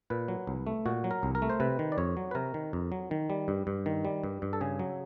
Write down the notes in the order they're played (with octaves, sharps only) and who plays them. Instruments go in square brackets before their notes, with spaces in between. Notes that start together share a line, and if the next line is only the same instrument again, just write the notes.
[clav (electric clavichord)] A#2 B4
F#3
C2
A3
A#2 F#4
F#3
A#4
C2
A#4
A3
C5
C3 B4
D#3
D5
F2 C#5
F#3
B4
C3 A#4
D#3
F2
F#3
D#3
G3
G2
G2
D#3
G3
G2
G2
A4
C#3 G#4
F#3